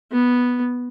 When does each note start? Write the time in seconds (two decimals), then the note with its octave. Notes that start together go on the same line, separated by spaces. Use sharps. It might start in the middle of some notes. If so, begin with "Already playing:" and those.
0.12 B3